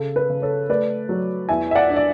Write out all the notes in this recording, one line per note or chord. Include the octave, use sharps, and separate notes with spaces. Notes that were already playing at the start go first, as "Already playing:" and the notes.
Already playing: C#3 A4
B4
C#3
A4 C#5
A3 B4 D5
F#3
E2 E5 G#5
E5
D5 F#5
D4
D5